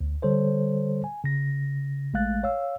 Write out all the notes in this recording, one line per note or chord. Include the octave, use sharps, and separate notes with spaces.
D2
D3 G3 A4 C5 C#5
G#5
C#3 A#6
A1 G#3 A3 F5 F#6 A6
C#5 F5 E6